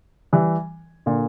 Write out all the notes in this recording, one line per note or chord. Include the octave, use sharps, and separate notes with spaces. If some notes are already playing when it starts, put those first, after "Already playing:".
E3 G3
A#2 D3